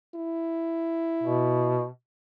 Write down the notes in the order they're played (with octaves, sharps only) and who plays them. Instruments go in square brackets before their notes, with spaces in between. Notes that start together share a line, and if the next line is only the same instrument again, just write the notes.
[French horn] E4
[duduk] B2